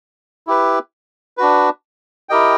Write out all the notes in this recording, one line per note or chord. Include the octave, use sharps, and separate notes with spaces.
E4 G4 B4
D4 F#4 B4
E4 G4 A#4 D#5 G5